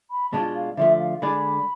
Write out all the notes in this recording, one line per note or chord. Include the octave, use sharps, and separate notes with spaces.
B5
B2 G#3 D4 F4 A5
F5
D3 F3 A3 E5
F5
D3 G#3 D4 G#4 D5 B5